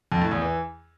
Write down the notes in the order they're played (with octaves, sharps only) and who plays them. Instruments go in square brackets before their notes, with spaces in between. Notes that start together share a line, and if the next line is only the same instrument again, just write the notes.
[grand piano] F2
A2
E2
E3